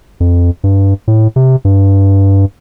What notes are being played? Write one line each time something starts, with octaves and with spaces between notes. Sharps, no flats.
F2
G2
A2
C3
G2